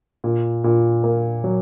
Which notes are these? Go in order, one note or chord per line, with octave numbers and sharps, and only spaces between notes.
A#2
A#2
A#3
F#3